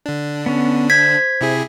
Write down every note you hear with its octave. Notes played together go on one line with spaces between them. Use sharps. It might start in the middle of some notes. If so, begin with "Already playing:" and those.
D3 D4
B3 C#4
C5 G6 G#6 B6
C3 E4 G#4